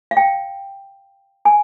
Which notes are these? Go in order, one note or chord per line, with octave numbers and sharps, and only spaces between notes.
F5
G5
G#5